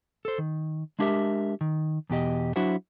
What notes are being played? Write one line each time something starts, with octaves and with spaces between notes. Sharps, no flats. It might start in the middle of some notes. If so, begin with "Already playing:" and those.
A4 C5
D#3
G#3 D4 E4 G4 A#4 E5
D#3
E2 B2 G4 D#5
F#3 D4 E4 F#4 C5 F#5